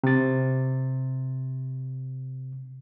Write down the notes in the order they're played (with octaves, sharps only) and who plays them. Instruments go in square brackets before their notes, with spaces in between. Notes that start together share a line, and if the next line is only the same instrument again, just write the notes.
[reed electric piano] C3 A6